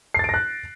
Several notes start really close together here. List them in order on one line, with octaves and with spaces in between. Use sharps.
C7 A6 D7 A#6 F#6